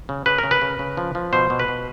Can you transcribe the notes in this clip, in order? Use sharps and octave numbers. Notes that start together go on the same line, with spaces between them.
C#3
C#3 B4
A#4
C#3
B4
C#3
C#3
F3
F3
B2 C5
B2
B4
B2